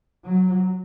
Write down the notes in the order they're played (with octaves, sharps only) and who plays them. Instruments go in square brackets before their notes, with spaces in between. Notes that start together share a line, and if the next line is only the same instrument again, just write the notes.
[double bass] F#3